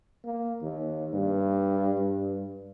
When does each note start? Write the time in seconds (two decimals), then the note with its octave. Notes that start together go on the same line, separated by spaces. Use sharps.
0.25 A#3
0.62 D#2
1.13 G2
1.98 G2